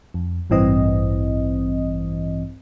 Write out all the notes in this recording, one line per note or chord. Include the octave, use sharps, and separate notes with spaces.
F2
A1 G2 E3 C4 D#5